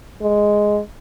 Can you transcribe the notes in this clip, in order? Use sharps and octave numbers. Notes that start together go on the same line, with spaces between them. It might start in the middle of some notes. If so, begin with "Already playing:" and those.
G#3